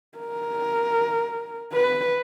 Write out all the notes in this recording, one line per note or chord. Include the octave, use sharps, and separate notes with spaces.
A#4
B4